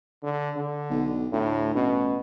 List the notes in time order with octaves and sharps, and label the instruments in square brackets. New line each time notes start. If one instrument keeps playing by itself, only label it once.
[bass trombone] D3
D3
[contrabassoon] B1
[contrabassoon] D2 [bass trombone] A2
[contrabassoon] A1 [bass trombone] B2